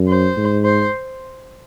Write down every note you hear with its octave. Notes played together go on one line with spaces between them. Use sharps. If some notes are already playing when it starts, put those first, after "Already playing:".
Already playing: F#2
C5
G#2
C5